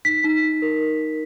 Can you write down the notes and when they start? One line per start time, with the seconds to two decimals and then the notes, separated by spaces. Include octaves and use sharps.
0.05 D#4 B6
0.24 D#4
0.43 D#4
0.62 A#4